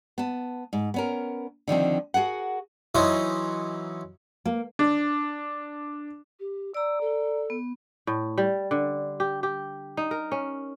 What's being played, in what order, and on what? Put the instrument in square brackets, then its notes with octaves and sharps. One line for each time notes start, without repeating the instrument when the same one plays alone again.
[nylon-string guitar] B3 A5
G#2
B3 C#4 A#4
D3 D#3 F3 C4
F#4 G#4 A#4 F#5
[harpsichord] E3 F#3 C#4 D#4 C5
[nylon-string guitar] A#3
[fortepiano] D4
[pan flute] G4
[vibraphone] D5 A#5 [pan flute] E6
[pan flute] A4
[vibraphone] B3
[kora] A2
G3
D3
G4
G4
D#4
A#4
C#4